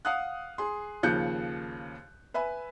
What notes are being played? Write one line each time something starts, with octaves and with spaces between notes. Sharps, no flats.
F5 F#5 D#6 F#6
G#4 C6
D#2 C#3 F3 F#6 G6 C#7
B4 E5 G#5 B5